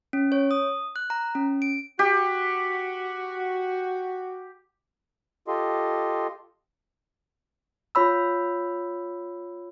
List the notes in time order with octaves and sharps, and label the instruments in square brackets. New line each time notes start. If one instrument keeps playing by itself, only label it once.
[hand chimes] C#4
C#5
D#6
F#6
A#5
C#4
D7
[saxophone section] F#4 [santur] G4
[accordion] F4 G4 A4 D#5 C6
[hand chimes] F4 C#5 B5 E6